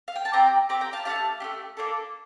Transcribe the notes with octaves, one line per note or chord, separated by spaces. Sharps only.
F5
G5
A5
C4 G4 G5 A#5
C4 G4 A#5 D6
G5 A#5
F5 A5
A3 D4 G4 F5 A5
A3 D4 G4
A#3 D4 A4